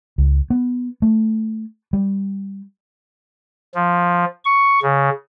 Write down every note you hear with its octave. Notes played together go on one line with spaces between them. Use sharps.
C#2
B3
A3
G3
F3
C#6
C#3